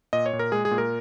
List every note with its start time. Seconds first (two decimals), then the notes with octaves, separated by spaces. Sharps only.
0.13 A#2 D#5
0.26 C#5
0.33 A#2
0.39 A#4
0.52 G#3 G#4
0.65 G#4
0.71 A#2
0.78 A#4